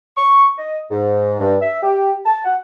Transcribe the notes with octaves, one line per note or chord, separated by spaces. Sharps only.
C#6
D#5
G#2
G2
E5
G4
A5
F#5